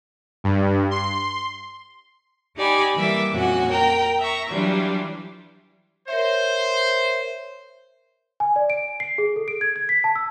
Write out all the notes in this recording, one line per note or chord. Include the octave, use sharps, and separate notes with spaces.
G2
C6
D#4 G4 D5 G#5 B5
E3 G3 A#3 E5 D6
F2 A#2 C#4 F#4 F#5
A#4 G5 A#5
E5 A#5 C#6
E3 F#3 G3 D4 F4
A#4 C5 C#5 E5
G#5
D5
D7
C7
G#4
A4
D7
G#6
G#6
B6
A5
E6